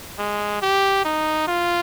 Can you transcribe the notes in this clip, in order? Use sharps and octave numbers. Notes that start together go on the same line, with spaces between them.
G#3
G4
D#4
F4